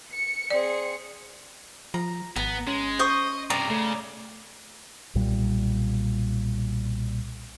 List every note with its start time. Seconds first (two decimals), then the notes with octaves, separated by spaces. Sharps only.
0.12 C#7
0.50 C4 G#4 D5
1.94 F3 A#5
2.36 G#1 B3 A#5
2.67 G#3 C#4
2.99 C5 D#5 C#6 D#6
3.50 G2 C3 D5 A#5
3.70 C#3 A3
5.15 B1 A#2 G3